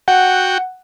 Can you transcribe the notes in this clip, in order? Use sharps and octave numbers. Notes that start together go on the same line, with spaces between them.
F#4 F#5 G5